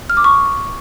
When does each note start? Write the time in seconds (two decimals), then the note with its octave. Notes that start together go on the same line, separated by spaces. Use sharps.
0.10 F6
0.17 D6
0.24 C#6